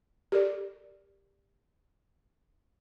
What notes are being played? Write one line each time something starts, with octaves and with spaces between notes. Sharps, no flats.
G4 A4 A#4 D5